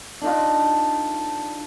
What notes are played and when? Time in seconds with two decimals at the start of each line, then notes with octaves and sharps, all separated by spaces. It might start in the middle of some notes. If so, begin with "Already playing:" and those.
0.22 D4 D#4 F4 A4